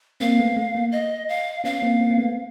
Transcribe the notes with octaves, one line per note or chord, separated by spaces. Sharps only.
A#3 C4 F5
A3 B3
A3
A#3
D#5
F5
B3 C#4 F5
A#3 C4
A#3 C4
C4
A3 B3